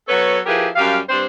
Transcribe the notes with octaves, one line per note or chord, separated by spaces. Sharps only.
F#3 B3 A4 B4 C#5
F3 E4 G4 G#4 A#4 B4
F#2 G3 G4 F5
G2 C4 D4 C5